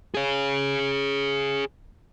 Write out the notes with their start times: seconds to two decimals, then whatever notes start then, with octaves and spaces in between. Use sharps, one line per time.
0.14 G#4 C#5